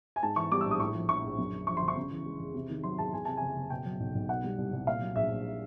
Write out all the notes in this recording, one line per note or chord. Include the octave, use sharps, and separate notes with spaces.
G#5
G#2 A5
E3 C#6
G3 D6
E6
A#1
D#6
A2 C#6
F3
A#1 C#6
A#1
F#2
D3
F3 C#6
C6
G1
C#6
C#3
E3
G#3
E2
C3
D#3
F#3 C6
E2 A5
E2 G#5
C3 A5
F#1 G#5
F#1
B2 G5
F#3
B1
B1
B2 F#5
G3
C2
C2
A#2 F5
F#3
A#1 E5
A#1